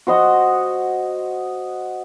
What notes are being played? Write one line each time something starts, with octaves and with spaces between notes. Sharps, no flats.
F#4 C5 D#5 F#5